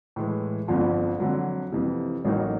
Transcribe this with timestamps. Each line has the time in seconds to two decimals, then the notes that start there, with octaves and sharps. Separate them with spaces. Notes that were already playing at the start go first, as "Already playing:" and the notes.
0.16 A2 E3 G#3
0.68 G1 F2 D3 F3
1.20 F2 D3 F#3
1.72 F2 C3 E3
2.25 A1 A2 F#3 A#3 D#4